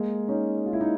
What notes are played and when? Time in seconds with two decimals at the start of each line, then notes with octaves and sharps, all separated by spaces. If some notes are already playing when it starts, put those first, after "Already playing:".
Already playing: G#3 A#3
0.28 C#4 D#4
0.66 F4
0.73 E4
0.81 D#4